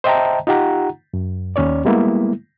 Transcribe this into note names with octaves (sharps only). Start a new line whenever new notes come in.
C5 D#5 E5 G5 A5 A#5
D#4 F4 G4 F#5 A#5
F#2
D#2 C#4 C#5 D5
G3 G#3 A#3 B3 E4